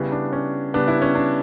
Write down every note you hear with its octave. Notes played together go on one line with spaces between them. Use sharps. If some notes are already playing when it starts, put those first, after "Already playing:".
Already playing: C#3 G3 B3 E4
D4
C#4
C#3 G3 B3 D4
E4
C#4
D4